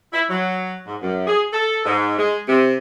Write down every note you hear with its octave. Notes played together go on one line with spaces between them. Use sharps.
E4
F#3
G#2
F#2
G#4
A4
G#2
G#3
C3